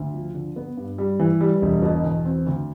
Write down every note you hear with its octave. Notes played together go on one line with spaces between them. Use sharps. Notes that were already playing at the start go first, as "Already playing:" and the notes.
Already playing: D2
F3
D3
B3
G2
G3
E3
G3
E1
B2
E2
C4
D2